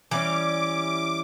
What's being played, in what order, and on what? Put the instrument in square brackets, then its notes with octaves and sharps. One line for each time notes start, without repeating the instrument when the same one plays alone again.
[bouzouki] E3 G3 C#4 [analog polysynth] D6